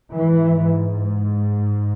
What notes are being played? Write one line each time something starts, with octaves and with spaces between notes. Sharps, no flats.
G#2 E3